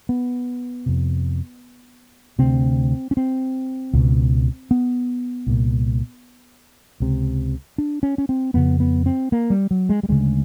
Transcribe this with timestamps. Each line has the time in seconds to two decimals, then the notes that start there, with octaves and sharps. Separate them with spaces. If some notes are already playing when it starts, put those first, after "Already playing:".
0.09 B3
0.86 F2 C3
2.39 D2 C3 C4
3.11 C#4
3.17 C4
3.93 C#2 B2
4.71 B3
5.47 C2 A#2
7.00 C#2 C3
7.78 D4
8.03 C#4
8.18 C#4
8.29 C4
8.54 F2 C#3 B3
8.80 B3
9.06 C4
9.32 A#3
9.50 G3
9.71 F#3
9.89 G#3
10.03 G3
10.09 D2 C#3 G#3